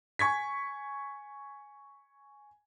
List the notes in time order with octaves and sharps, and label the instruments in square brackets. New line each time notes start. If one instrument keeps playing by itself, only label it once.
[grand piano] G#5 C#6 G#6 B6